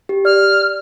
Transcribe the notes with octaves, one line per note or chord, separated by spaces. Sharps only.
G4
D5 F6